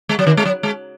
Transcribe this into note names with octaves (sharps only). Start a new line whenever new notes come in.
G#3
F#3
D#3
G#3
F#3
G#3